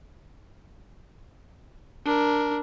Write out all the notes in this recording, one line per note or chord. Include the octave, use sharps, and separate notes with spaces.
D4 A#4